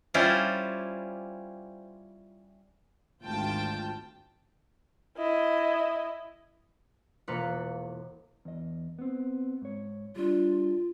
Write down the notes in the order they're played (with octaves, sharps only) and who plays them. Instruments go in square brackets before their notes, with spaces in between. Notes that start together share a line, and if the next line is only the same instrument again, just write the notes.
[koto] G3 C#4 E4 F4 C5 D5
[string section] G#1 D2 F4 G5 A5
[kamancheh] E4 D#5
[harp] E1 A#3 F4 B4 C#7
[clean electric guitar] E2 D#5
B3 C4
G#2 C#5
[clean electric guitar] G3 D4 [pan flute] F4